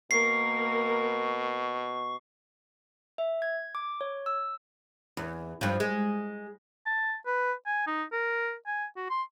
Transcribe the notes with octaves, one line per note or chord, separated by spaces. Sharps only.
B2 A#3 A#4 C#6 C7
E5
G#6
D6
C#5
E6
E2
G2 F3
G#3
A5
B4
G#5
D#4
A#4
G#5
F#4
C6